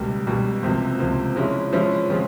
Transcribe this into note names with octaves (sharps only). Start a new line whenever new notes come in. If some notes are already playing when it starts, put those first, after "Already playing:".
Already playing: C#2 B2 G3 A#3
C#2 B2 G3 A#3
C#2 C3 F3 A#3
C#2 C3 F3 A#3
F3 G#3 C#4 E4
F3 G#3 C#4 E4
C#3 F3 G#3 C4 F4